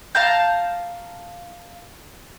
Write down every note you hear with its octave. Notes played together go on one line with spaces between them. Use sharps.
F5 A5 A#5 G6